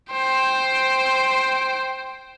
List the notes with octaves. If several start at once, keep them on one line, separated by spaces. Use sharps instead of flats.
C5 G5